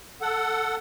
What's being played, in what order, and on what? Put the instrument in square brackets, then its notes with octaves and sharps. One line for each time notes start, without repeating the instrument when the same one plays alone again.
[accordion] A4 F#5